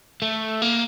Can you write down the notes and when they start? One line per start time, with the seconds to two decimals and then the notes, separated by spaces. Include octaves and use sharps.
0.22 A3
0.62 A#3